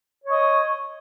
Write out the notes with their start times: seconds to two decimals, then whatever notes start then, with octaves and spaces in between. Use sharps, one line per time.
0.24 C#5
0.27 C#6
0.30 D#5